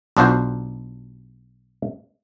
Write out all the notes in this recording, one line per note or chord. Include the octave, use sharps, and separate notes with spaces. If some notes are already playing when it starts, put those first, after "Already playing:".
B1 D4 F4 F#4 C5